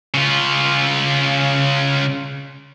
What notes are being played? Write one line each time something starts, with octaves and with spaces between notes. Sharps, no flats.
C#3 F4